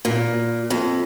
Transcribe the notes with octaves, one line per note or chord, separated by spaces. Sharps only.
A#2
F2